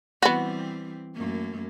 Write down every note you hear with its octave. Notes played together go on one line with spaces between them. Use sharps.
E3 G3 B3 C4 F#4
F#2 A3 A#3